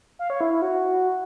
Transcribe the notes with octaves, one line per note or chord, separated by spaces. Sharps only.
F5
C#5
E4
E4
F#4